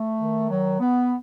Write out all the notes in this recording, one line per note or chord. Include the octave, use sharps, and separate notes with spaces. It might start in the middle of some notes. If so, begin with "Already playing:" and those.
Already playing: A3
D#3
F#3
B3